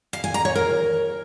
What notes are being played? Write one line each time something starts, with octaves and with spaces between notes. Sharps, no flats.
F5
G#5
A#5
C#5
A#4